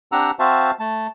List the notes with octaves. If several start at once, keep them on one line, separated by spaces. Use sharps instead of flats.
C4 D4 G4 F#5 A#5 E6
C4 F#4 C5 E5 F5 A5
A3 A5